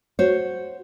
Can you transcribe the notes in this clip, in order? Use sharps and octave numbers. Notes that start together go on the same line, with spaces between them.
F#4 C5 C#5